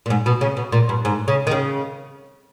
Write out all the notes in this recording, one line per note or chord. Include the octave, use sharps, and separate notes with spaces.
A#2
G#2
B2
C#3
B2
A#2
G2
G#2
C#3
D#3
C#3